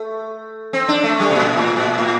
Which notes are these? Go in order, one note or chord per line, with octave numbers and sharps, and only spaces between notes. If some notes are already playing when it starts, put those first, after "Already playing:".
Already playing: A3
C4
D4
A3
G3
C3
A#2
A2
A#2
A2